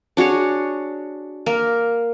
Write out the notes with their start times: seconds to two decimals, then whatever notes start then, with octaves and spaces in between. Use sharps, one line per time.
0.17 D4 F#4 G#4 C#5
1.46 A#3 A#4